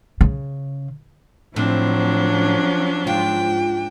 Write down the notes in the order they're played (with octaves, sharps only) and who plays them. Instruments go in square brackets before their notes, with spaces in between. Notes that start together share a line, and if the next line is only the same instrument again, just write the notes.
[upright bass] C#3
[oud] A2 [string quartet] F3 F#3 [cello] C4 [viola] D4
[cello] C#4
[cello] G#2 G5 [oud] F4